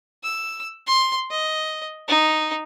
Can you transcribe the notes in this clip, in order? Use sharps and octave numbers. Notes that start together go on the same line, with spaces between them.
E6
C6
D#5
D#4